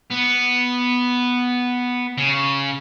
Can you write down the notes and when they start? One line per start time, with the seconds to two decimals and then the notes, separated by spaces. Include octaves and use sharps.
0.10 B3
2.18 C#3